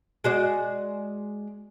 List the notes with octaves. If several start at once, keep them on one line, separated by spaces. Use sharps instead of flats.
G#3 F#4 D5